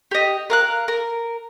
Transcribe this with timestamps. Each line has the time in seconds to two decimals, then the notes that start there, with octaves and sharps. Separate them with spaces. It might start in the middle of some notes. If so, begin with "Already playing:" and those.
0.11 G4 D#5
0.50 A#4 F5 F#6
0.88 A#4